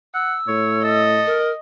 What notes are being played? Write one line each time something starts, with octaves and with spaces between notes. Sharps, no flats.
F#5 E6
A2 C#5
A4 D#5
A#4